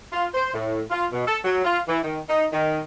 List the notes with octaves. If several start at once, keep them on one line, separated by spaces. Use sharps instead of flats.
F4
C5
A2
F4
B2
A4
F#3
F4
E3
D#3
D#4
D#3